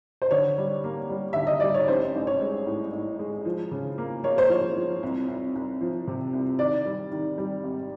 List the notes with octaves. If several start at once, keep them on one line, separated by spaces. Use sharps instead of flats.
C5
D3 C#5
G3
A#3
G3
D3 E5
D#5
G3 D5
C#5
A1 C5
A1
C#5
G#3
A2
A2
G#3
F3
C#3
A#3
A#3 C#5
C5
F3 C#5
F3
C2
C2
C2
F3
C3
C2
D#3 D5
G3
D#3
G3
G#1